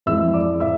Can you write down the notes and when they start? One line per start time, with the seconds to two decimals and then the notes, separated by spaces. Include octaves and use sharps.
0.06 F2 E3 G#3 E5 E6
0.34 D5 D6
0.60 E5 E6